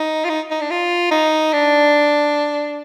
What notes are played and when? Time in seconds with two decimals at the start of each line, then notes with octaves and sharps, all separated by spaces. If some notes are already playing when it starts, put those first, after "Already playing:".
Already playing: D#4
0.25 F4
0.29 D#4
0.51 D#4
0.61 D4
0.70 F4
1.11 D#4
1.53 D4